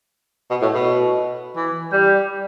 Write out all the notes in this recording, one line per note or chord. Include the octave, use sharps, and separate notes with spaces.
B2
A2
B2
E3
G3